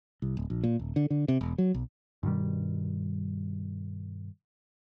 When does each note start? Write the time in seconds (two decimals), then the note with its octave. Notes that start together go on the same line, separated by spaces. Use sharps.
0.22 C2
0.37 D1
0.50 A#1
0.64 A#2
0.79 D#1
0.96 D3
1.10 D3
1.28 C3
1.41 E1
1.58 F#3
1.74 B1
2.23 G2 B2 D#3 G3